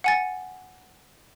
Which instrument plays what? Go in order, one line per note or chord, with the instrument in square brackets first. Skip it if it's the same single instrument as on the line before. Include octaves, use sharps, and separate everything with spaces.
[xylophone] F#5 G#5 A6